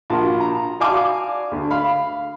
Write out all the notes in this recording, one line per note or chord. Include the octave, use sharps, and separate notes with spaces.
A#1 F4 F#4 A5
A#5
F#4 D5 F5 G#5 A5 D6
D2
F5 B5